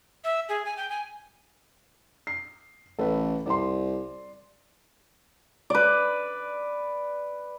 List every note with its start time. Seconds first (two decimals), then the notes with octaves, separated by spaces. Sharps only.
0.24 E5
0.49 G#4
0.65 G#5
0.77 G5
0.90 G#5
2.27 C7
2.99 A1 A4 B4
3.46 C2 D5 C6
5.70 B4 D5